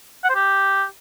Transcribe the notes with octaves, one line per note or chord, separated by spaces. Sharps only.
F#5
C5
G4